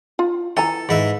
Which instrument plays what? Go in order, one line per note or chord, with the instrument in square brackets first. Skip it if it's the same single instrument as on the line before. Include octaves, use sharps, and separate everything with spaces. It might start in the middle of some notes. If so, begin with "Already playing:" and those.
[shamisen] F4
[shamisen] E3 G#5 A#5 [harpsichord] A4
[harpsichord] G#2 B4 E5